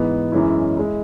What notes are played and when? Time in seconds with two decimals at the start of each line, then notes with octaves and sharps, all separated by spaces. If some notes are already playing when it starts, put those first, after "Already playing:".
Already playing: G#2 E3 B3
0.32 F#2 E3 G#3 C#4 E4
0.77 G#3 E4